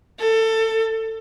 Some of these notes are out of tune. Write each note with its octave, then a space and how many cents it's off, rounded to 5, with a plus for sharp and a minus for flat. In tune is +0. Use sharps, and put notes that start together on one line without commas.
A4 +25